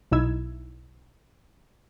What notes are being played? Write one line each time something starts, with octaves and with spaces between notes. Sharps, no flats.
B1 B2 D#4 E4 E6 G#6